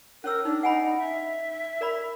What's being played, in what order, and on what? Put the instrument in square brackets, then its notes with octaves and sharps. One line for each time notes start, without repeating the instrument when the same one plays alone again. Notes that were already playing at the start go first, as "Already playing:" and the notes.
[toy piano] C#4 C#5 E6 [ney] A#4
[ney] D4 [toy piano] D#4
[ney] D#4 [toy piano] F#5 G#5 B5
[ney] E5
[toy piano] A#4 D5 B5